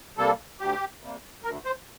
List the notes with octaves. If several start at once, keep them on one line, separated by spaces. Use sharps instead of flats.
C3 G3 A#3 A4
D2 G4
C3 G3 A#3
D2 A#4
C5